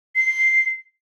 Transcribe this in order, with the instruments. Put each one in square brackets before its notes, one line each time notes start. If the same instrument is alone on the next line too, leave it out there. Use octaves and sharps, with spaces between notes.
[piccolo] C7